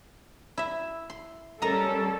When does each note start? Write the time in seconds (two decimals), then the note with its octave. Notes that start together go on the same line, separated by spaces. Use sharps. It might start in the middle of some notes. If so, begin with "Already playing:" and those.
0.57 E4 E5
1.10 C6
1.62 G3 C#4 A4 A#4 D#5 A#5